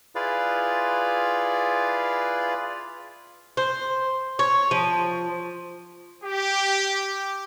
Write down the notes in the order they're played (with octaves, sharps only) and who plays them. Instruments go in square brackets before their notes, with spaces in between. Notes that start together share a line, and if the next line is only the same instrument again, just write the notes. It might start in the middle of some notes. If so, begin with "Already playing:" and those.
[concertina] E4 F4 G#4 B4 D5 F5
[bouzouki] C5
C#5
F3
[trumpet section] G4